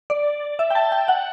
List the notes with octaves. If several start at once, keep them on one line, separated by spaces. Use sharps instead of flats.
D5
E5
G5
A5
G5
F#5